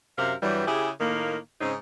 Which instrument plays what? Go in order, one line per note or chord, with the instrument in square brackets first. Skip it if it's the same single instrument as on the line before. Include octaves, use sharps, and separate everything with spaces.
[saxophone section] F#2 C3 A#4 F5
G2 E3 F#3 G3
C#3 E4 G4 G#4
A2 D#3 A#3
G#2 C#3 C4 C#4 D#4